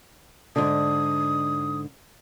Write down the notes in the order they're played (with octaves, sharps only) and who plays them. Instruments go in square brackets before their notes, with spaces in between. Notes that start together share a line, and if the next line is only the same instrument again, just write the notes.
[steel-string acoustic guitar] G#2 D3 [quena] D#6